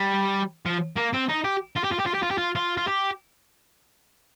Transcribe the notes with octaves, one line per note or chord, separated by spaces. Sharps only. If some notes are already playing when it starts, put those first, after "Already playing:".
Already playing: G3
F3
A#3
C4
D#4
G4
F4
G4
F4
G4
F4
G4
F4
G4
F4
F4
F4
G4